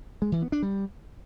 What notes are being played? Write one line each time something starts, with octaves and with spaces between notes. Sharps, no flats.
G#3
E3
B3
D4
G3